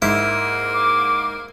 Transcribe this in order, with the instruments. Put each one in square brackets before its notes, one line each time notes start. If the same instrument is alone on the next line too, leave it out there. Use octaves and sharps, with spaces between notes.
[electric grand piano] G#2 [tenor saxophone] A#3 [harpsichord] E4
[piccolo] D6